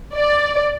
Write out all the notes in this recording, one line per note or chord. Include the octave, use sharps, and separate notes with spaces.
D5